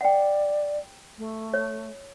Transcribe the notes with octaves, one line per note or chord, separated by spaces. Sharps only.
D5 F#5 G5
A3
C#5